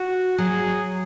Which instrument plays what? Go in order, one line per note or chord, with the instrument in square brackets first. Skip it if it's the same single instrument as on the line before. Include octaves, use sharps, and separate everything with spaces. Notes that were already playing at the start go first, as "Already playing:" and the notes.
Already playing: [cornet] F#4
[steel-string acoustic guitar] F#3 [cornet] G#4